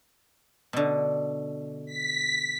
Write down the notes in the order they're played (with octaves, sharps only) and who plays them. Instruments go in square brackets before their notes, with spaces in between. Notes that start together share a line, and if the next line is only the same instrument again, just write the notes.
[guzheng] B2 D3
[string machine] B6